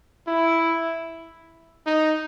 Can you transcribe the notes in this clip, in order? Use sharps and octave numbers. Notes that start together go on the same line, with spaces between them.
E4
D#4